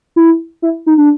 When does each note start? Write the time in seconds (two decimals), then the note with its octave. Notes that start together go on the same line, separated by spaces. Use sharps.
0.16 E4
0.62 E4
0.86 D#4
0.98 D4